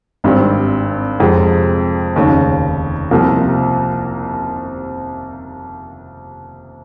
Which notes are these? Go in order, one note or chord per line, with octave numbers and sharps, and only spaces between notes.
G#1 G2 G3 C4
F2 C3 F3 G#3
F1 D#2 C#3
C2 C3 F3 A#3